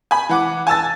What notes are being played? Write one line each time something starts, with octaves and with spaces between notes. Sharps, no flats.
G#5 B5
E3 F#5 D6
G#5 A5 E6 A6